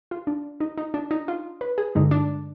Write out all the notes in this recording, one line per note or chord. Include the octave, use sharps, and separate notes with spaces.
F4
D4
D#4
D#4
D4
D#4
F4
B4
G#4
G2 D3 G#3 D#4
D4